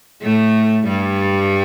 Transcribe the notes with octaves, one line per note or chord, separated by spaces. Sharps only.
A2 A3
G2 G3